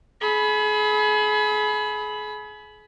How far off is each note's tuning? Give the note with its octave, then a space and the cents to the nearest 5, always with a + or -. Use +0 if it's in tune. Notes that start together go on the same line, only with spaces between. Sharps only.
G#4 +35 B5 +0